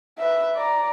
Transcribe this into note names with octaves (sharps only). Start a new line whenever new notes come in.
B4 E5
D5 A#5